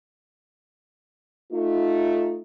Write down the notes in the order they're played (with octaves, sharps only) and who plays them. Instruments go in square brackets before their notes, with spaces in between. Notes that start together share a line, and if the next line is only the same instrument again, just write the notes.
[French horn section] A3 D#4 [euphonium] F4